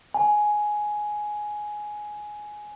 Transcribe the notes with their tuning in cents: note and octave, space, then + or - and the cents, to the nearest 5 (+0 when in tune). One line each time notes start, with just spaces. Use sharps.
G#5 +10